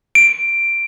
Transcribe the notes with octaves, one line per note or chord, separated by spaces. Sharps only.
D7